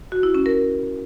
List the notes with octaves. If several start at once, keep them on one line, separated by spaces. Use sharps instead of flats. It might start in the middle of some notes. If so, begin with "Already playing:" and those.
F#4
E4
C#4
A#4